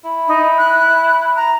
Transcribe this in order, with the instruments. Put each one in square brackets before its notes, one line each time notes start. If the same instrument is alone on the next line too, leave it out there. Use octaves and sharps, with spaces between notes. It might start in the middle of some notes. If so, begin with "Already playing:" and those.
[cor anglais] E4
[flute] D#4
F#6
A#5